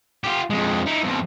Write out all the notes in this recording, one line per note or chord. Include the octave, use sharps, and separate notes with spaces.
F4 G4
F2 G#3
D#4 E4
F2 B2